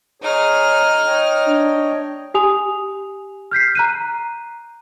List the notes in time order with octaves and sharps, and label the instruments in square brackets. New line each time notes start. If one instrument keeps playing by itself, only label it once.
[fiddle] D#4 F6 [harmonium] G#4 C#5
[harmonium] C#5 D#5 G5
[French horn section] D4
[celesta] G4 G#5 D#6 F7
F6 G6 B6 C7
A#5 F#6 D#7